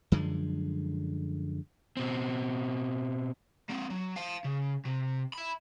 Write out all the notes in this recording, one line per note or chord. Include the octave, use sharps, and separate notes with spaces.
F#2 D3 F3 G#3
B2 C4
A#3 C4
F#3
F5 A5
C#3
C3
E5 B5